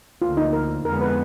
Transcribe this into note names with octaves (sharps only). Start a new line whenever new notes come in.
D2 D3 F3 A#3 F4
D#4
A#4
F2 D3 G#3 B3 A#4
B4